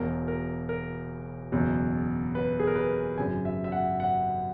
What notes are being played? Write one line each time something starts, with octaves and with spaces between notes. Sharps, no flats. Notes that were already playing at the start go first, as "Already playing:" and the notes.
Already playing: E1 E2 B2 A#4
A#4
A#4
F#1 E2 B2
B4
G#4
A#4
B4
G#1 F#2 C#3 G#5
E5
E5
F#5
F#5